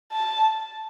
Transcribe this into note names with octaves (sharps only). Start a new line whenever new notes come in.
A5